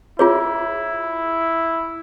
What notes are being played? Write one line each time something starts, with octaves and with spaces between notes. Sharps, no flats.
E4 F4 G#4 C#5